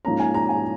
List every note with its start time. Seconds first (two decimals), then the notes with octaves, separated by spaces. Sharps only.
0.05 G#2 F3 A#3 C#4 A#5
0.20 G#5
0.34 A#5
0.49 G#5